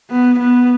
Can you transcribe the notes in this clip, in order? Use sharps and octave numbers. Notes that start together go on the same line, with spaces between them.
B3
B3